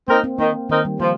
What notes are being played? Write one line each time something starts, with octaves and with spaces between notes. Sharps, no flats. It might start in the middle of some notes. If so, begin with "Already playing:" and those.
A#3 C4 D#4 A#4
C4
D#3 A#3
D#3 C4 D#4 A#4
G3
F3 A#3